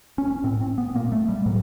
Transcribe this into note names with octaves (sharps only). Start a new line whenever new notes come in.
C#4
A2 C4
C4
B3
A#2 A#3
A3
G3
A2 F#3